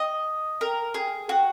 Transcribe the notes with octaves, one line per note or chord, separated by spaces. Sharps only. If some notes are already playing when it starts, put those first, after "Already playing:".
Already playing: D#5
A#4
G#4
F#4